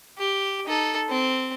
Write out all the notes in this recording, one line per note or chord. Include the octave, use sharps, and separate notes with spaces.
G4
D#4 A4
C4